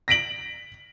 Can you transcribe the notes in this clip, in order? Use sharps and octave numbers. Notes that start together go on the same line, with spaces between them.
A#6 B6 D7 F#7